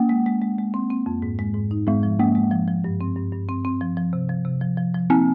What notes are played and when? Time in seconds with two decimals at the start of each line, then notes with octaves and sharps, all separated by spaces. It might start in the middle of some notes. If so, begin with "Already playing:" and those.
Already playing: A#3
0.09 G#3
0.26 G#3
0.41 G#3
0.58 G#3
0.74 C4
0.90 C4
1.06 F2
1.22 G#2
1.39 G#3
1.54 G#2
1.71 D#4
1.87 G#2 G#3
2.03 F3
2.19 G#3 A#3
2.35 G#3
2.51 F3
2.68 F3
2.84 G2
3.01 C4
3.16 G2
3.32 G2
3.49 C4
3.65 C4
3.81 F3
3.97 F3
4.13 C3
4.29 F3
4.45 C3
4.62 F3
4.77 F3
4.94 F3
5.10 A#3 C4